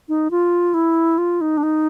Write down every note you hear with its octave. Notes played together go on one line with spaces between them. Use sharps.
D#4
F4
E4
F4
D#4
D4
D#4